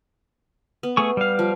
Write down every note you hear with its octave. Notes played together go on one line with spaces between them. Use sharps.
B3
A3 G#4 C#6
G3 F5
F3